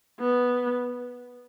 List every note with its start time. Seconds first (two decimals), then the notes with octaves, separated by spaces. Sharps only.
0.20 B3